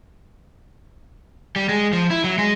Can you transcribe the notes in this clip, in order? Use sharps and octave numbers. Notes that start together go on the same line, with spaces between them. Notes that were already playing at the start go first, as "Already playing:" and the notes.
G3
G#3
F3
E4
F#3
G#3